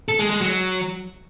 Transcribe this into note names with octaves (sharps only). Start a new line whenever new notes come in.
A4
G#3
G#3
F#3